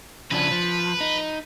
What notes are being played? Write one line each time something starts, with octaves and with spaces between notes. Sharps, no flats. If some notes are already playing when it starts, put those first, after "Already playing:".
C#3 F3 D4 B4
F3
D#4